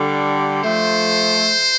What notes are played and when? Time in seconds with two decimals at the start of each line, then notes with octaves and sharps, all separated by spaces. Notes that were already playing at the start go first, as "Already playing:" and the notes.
Already playing: D3 G3
0.63 F3 A3 C5